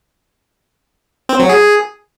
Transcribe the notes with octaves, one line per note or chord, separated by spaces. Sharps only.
C4
F#3
G#4